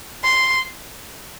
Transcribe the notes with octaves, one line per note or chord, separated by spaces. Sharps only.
C6